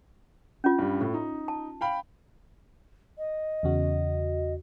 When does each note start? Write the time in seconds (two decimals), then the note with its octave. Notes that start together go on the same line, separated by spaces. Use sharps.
0.64 C#4 F4
0.78 G2 G3
1.01 A2
1.14 D#4
1.48 A5
1.81 F5 G5 B5
3.18 D#5
3.63 E2 C#3 F#4